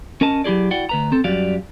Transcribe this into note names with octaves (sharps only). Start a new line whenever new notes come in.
C#4 A#4 D#5 A5
F#3 E4 G4 G#4 D5
E4 F#4 D5 F#5 G5
D2 B4 A#5
C4 A4
F#2 G3 F#4 D5 F5